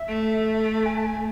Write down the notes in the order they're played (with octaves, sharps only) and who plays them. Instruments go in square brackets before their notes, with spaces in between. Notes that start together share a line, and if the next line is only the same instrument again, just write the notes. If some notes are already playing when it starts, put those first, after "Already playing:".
Already playing: [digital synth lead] E5
[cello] A3
[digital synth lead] G#5
A5
G#5